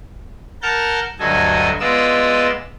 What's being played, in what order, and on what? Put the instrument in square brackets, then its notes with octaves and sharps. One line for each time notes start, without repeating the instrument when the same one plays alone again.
[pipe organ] A#4 F#5 A5 F6 G6
D2 G2 F#3 A4 D#5 G#5
G#3 B3 F4 D5 D#5 E6